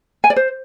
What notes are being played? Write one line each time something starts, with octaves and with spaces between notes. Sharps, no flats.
G#5
D5
C5